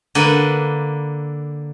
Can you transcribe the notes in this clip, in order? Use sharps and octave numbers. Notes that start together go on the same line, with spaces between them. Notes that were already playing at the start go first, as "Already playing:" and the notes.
D3 A#3 B4 B5